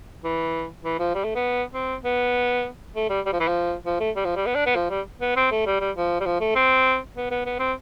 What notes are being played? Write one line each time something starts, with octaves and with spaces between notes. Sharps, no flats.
E3
E3
F3
G3
A3
B3
C4
B3
A3
G3
G3
F3
E3
F3
F3
A3
G3
F3
G3
B3
D4
B3
F3
G3
B3
C4
A3
G3
G3
F3
G3
F3
A3
C4
B3
B3
B3
C4